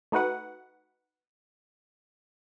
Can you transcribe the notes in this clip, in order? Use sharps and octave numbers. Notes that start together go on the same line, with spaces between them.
A3 D#4 F#4 B4 F#5